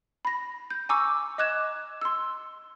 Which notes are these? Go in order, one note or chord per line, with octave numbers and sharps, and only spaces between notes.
B5 A#6
G6
G#5 A#5 C#6 D6 E6
D#5 D6 F#6 G#6 E7
C6 E6